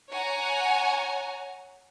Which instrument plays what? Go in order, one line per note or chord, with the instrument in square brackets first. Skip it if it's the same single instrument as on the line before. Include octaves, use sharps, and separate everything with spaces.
[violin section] C#5 F#5 G#5 A#5